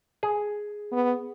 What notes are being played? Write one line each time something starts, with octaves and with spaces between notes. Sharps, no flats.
G#4
B3